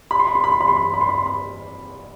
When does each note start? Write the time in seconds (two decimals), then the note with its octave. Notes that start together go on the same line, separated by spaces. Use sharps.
0.11 B5
0.19 C6
0.27 B5
0.35 C6
0.44 B5
0.52 C6
0.61 B5
0.68 C6
0.76 B5
0.85 C6
0.94 B5
1.01 C6
1.09 B5
1.18 C6
1.26 B5